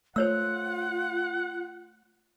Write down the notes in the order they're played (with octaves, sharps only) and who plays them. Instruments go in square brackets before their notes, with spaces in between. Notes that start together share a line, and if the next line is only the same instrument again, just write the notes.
[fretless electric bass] A3 [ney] F4 [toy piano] C5 C#5 E6 [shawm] F#5